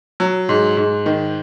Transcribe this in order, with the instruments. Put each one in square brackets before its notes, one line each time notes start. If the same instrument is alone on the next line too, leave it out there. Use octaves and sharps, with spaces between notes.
[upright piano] F#3
G#2
G#2
D#3